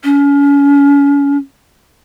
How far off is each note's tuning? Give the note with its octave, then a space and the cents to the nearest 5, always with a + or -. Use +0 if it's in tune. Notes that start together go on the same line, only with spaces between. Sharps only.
C#4 +35